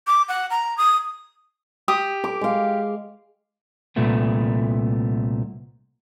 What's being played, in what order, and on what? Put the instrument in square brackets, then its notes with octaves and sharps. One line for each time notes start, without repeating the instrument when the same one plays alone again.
[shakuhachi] D6
F#5
A#5
D#6
[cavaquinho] G4 D#6
[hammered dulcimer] D6
G#3 F5
[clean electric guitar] C2 A#2 A3 B3